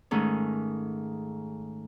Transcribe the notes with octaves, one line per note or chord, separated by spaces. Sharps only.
G#2 D#3 G#3 A3 C#4